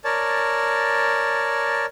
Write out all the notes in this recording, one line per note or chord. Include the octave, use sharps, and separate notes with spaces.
A#4 C#5 D5 A5